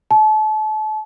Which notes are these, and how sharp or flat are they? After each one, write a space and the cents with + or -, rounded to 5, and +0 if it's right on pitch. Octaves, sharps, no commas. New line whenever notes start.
A5 -35